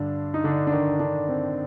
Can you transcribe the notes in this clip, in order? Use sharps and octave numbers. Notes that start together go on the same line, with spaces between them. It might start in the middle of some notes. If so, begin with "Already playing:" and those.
Already playing: G2 D3 D4
D#4
D3 D4
D4
D#3 D#4
D3 D4
C4